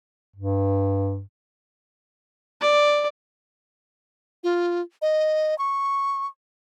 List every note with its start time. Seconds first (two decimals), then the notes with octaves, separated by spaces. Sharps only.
0.36 G2
2.61 D5
4.44 F4
5.02 D#5
5.59 C#6